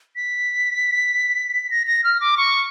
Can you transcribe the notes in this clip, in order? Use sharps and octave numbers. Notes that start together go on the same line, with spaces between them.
B6
A#6
A#6
F6
D6
C#6